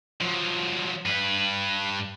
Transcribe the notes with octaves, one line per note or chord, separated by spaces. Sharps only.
F3 F#3
G2 B4